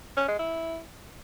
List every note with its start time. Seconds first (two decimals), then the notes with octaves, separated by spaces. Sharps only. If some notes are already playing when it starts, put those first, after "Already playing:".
0.17 C#4
0.28 G#3
0.39 E4